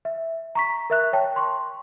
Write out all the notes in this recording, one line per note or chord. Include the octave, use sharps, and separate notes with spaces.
E5
A#5 C#6 B6
A#4 E5 F#6
C#5 G5 A5
C6 C#6